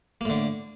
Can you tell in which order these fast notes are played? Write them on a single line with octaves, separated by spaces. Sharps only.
A#3 A2 D3